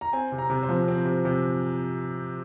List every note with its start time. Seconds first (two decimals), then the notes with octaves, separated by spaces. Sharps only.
0.01 A#5
0.13 C4 G#5
0.32 C3
0.38 A#5
0.50 C3
0.63 C5
0.69 F3
0.88 C4
1.05 C3
1.25 C3